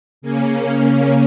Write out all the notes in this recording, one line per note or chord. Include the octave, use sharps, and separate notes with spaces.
C#3 A#3 C#4